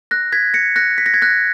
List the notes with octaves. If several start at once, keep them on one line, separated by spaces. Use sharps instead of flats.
F#6 A#6
G#6 B6
A#6 C#7
F#6 A#6
B6
A#6
G#6
F#6 A#6